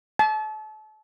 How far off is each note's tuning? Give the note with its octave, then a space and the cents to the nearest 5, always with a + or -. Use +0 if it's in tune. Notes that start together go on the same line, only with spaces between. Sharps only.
A5 -35